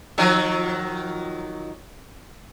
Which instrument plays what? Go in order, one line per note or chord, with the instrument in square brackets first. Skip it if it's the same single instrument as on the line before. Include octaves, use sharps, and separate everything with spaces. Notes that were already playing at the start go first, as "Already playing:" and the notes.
[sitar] D#3 F3 F#3